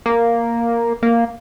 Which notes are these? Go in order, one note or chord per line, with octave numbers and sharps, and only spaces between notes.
A#3
A#3